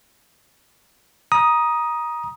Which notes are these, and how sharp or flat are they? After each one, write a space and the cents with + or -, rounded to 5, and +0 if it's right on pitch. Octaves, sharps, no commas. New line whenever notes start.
A#5 +25 D#6 +0